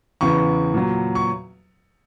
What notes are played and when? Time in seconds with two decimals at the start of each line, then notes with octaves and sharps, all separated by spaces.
0.21 E2 C#3 E3 C#6
0.74 A#2 F#3
1.15 C#6